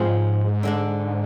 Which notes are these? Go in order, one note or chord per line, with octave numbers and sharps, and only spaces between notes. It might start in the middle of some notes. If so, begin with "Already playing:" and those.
Already playing: G#2 F3 C4 F4 G#4
D3 G#3 D4